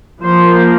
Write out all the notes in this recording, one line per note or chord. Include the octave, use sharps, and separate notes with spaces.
F3 A#3 C5